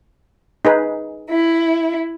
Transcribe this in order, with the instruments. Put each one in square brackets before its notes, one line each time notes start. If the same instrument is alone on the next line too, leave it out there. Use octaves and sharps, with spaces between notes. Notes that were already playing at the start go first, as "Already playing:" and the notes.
[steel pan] D#4 G#4 B4
[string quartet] E4